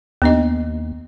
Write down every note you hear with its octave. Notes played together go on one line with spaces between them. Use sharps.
D#2 B3 D4 D#5